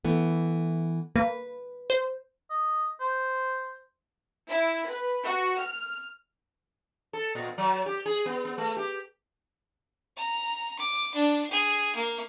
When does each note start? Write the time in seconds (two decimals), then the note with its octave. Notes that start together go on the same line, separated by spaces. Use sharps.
0.05 E3 A3 B3
1.16 A#3 B4
1.90 C5
2.50 D#5
3.00 C5
4.49 E4
4.90 B4
5.25 F#4
5.62 F6
7.13 A4
7.35 A#2
7.58 F#3
7.86 G4
8.06 G#4
8.26 B3
8.45 B3
8.58 A3
8.77 G4
10.17 A#5
10.79 D6
11.14 D4
11.50 G#4
11.95 A#3